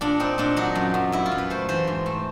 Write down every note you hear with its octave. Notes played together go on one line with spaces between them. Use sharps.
A#2 D4
C4 D#4
A#2 D4
F#3 D#4
F#2
F#2
F#2 E4
F4
F#2
B4
A3 C5
E3 C5
G#2
A3